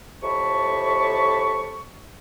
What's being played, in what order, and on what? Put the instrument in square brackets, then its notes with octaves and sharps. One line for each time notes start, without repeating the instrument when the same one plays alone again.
[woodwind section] F2 A2 C3 A5 B5 C#6